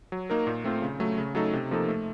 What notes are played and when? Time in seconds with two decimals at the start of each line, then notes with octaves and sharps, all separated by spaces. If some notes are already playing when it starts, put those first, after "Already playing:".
0.12 F#3
0.30 A#3 D#4 A#4
0.47 A#2
0.64 A3 C4 F4
0.82 C#3
1.00 F#3 A3
1.18 C#3
1.35 F#3 A3 D#4 A4
1.53 C3
1.71 F3 A#3 D#4 A4
1.88 A3